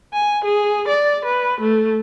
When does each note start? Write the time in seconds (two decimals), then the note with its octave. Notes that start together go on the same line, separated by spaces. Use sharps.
0.13 G#5
0.44 G#4
0.88 D5
1.25 B4
1.60 A3